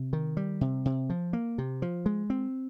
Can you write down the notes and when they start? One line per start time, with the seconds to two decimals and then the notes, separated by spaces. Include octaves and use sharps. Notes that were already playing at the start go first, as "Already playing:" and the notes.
Already playing: C3
0.13 D#3
0.37 G3
0.61 C3
0.85 C3
1.10 F3
1.33 A#3
1.58 C3
1.82 F3
2.06 G#3
2.30 C4